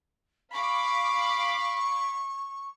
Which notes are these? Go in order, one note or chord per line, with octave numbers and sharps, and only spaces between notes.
F5 B5 C#6 D6